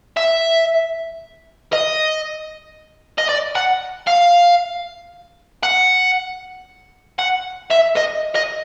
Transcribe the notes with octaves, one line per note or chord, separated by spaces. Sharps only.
E5
D#5
D#5
D5
F#5
F5
F#5
F#5
E5
D#5
D#5